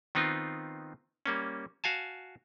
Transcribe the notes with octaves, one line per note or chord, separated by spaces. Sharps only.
D#3 B3 C4 D#4 F4
G3 A#3 C#4
F#4 F5 G#5 A5